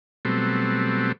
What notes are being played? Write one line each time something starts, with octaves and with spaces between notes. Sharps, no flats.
B2 F#3 G3 A3 C4